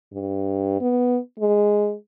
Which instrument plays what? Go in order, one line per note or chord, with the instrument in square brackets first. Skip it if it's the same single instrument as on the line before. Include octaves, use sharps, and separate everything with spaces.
[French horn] G2
B3
G#3